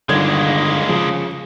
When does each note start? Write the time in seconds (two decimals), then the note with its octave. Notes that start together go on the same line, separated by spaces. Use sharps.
0.09 G1 D3 D#3 G#3 A#3 G#6
0.89 C#3 F3